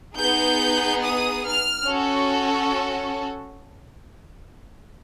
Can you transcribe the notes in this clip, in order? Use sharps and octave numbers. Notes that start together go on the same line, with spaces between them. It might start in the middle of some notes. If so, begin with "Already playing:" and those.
B3 D#4 G#4 G6
D#6
F6
C#4 F#4 A4